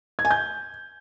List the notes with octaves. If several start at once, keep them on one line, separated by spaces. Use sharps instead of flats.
G#6
G#5
G6